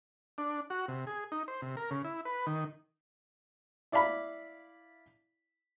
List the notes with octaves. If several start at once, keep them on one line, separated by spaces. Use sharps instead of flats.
D4
F#4
C3
G#4
D#4
C5
C3
A#4
C#3
E4
B4
D#3
E4 D5 F5 B5